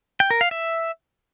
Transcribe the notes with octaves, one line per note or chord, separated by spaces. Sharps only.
G5
A#4
F5
E5